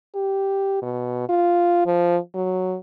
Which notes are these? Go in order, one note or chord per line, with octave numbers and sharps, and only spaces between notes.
G4
B2
F4
F3
F#3